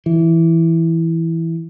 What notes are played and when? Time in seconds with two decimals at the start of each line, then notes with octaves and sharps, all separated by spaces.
0.06 E3